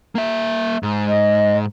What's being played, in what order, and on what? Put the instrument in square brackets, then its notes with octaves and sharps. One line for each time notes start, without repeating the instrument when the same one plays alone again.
[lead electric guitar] A#3 E5
G#2
[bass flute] D#5